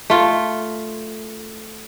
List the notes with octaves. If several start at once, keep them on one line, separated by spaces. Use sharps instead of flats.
A3 F4